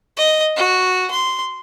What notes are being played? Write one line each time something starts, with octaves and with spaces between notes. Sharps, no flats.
D#5
F#4
C6